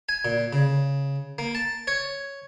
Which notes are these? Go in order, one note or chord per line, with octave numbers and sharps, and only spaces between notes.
G#5
A#2
C#3
A#3
A5
C#5